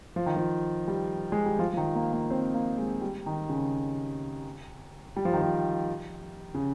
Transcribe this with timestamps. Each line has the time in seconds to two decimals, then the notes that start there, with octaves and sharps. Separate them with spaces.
0.16 F3
0.26 D#3
0.37 F3
0.88 G3
1.32 G#3
1.46 G3
1.59 F3
1.73 F3
1.77 D#3
1.95 A#3
2.13 A#3
2.30 C4
2.54 A#3
2.78 G#3
3.02 G3
3.26 D#3
3.49 C#3
5.16 G3
5.25 F3
5.33 D#3
5.42 F3
6.54 C#3